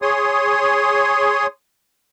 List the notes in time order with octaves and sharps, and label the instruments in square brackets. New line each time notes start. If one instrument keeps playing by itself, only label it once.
[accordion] G#4 C#5 C6 D#6